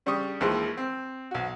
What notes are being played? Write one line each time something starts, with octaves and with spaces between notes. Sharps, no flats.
C#3 G3 D4 G4 C#6 D#6
D#2 E3 F3 G#3 B4
C4
B1 F#4